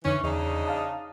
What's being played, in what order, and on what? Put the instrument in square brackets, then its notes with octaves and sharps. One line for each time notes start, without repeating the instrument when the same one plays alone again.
[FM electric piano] F2 D3 D#4 [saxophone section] E3 C#4
[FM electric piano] E2 [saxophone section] C#3 D4 D#4
[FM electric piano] F5 A5 D#6